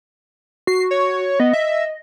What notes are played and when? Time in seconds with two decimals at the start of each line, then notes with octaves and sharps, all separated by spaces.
0.67 F#4 C7
0.91 C#5
1.40 B3 D#5
1.53 E5